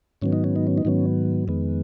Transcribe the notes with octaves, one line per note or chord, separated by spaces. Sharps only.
G#2 D#3 F#3 B3 C#4
D#4
C#4
D#4
C#4
D#4
G#2 D#3 F#3 B3 C#4
F2 D#3 G#3 B3